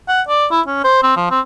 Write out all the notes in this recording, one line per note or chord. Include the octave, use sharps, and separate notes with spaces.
F#5
D5
E4
C#4
C5
C4
F3
C4